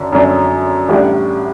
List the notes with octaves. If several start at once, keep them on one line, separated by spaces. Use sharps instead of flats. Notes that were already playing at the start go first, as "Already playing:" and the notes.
Already playing: F#2 D3
F#2 D3 F#3
A1 A2 G3 D4